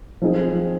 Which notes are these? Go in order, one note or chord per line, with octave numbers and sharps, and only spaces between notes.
F3 C4 D#4 G#4